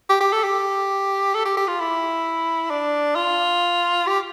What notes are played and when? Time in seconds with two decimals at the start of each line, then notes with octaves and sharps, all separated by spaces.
0.09 G4
0.20 G4
0.32 A4
0.43 G4
1.34 A4
1.45 G4
1.57 G4
1.68 F4
1.80 E4
2.70 D4
3.16 F4
4.07 G4